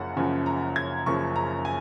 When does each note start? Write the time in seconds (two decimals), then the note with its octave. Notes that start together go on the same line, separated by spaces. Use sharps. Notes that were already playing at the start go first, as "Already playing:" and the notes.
Already playing: F#1 F#2 C#3 F3 F#5
0.16 F#1 F#2 C#3 F3 G#5
0.46 A#5
0.76 G#6
1.06 F#1 F#2 C#3 F3 C#6
1.36 A#5
1.65 G#5